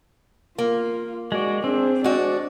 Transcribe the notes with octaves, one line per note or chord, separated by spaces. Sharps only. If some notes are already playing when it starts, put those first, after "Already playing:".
A#3 F4
G#3 F#4 D5
C4 D4 G#4
G#3 D4 F#4 D5